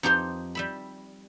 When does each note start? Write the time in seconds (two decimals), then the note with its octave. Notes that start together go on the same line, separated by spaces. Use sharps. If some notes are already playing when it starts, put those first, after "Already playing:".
0.03 F2 D#4 G4 C5 C6
0.55 G3 E5 B5